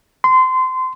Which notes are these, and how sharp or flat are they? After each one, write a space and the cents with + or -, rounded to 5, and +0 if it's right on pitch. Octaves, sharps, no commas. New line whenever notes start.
C6 -25